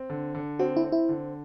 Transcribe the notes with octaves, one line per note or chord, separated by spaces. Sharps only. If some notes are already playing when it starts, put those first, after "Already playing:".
Already playing: C4
D3
D3
C4 F#4
E4
C4
E4
D3